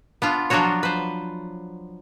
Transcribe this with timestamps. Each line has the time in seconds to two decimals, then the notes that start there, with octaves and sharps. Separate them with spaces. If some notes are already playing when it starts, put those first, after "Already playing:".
0.22 B3 D4 F4
0.50 F3 F#3 D4 F4 F#4 C#5
0.83 B4 C5